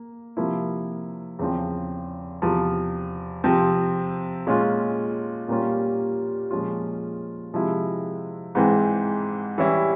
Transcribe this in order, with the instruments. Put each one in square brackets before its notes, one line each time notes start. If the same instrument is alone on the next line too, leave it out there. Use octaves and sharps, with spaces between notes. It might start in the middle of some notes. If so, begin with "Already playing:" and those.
Already playing: [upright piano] A#3
C3 F3 A#3 E4
E2 C#3 F3 C4
E2 C3 F3
C3 F3 C4
A#2 G#3 C#4 F4
A#2 G3 A#3 C#4 F4
A#2 F3 G#3 C#4 F4
C3 F3 G#3 E4
G#2 E3 G#3 C4
E3 G3 C#4 E4